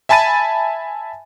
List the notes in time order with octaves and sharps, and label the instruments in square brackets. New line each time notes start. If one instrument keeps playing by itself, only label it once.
[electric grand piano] E5 G#5 A5 B5 A6 D#7